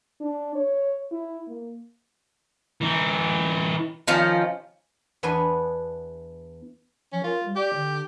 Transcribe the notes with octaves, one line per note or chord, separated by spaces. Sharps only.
D4
C#5
E4
A#3
E3 D#4
D#3 F3 C#4
E2 B3 D4 B4 G#5 C6
F3 C#4
F4 A#4
G3
G4 D5
D3